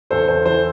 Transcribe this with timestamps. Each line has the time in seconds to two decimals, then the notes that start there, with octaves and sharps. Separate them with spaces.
0.10 E2 A4 C5
0.28 E2 A4 C5
0.46 E3 A4 C5